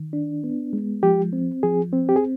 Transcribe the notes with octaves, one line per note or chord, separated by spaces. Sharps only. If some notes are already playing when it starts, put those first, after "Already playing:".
Already playing: D#3
D4
B3
G#3
F3 G4
C4
F3 G#4
C4
G4
G#4